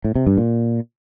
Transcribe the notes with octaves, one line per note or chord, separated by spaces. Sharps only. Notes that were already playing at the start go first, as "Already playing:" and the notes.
A2
C3
G2
A#2